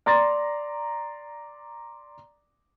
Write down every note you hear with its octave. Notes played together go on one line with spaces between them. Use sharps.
D5 A#5 C6 A6